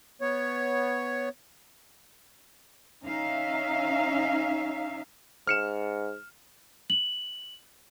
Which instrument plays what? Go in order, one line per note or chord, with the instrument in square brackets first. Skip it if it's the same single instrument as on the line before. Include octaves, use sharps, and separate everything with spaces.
[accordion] B3 C#5
[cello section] C#4 D#4 E5 F5
[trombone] G#2 [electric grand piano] F6 C#7 E7
[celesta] F#7